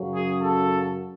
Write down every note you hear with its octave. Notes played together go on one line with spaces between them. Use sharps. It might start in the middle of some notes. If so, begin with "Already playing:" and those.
Already playing: F#2 C#3 F#3 C#4
G#4
A4